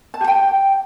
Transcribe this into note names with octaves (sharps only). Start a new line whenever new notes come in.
A5
G4
G5